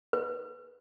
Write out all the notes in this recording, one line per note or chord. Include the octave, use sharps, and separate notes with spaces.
B4